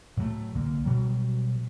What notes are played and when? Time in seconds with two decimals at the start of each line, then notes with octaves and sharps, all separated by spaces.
0.17 A2 F#3 G3 A3
0.54 C2 D3 A#3
0.85 B2 F#3 G3